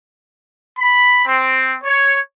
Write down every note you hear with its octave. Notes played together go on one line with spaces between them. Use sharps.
B5
C4
C#5